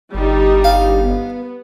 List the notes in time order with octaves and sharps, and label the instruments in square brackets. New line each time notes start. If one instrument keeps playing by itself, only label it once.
[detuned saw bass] G1 [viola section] G3 D#4
[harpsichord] F5
[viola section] B3